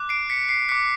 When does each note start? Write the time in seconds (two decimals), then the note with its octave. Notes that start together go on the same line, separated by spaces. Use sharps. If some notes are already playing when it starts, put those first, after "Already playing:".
Already playing: D6 F#6
0.09 C7 D7
0.30 B6 C#7
0.49 C7
0.69 D6 F#6 B6 C#7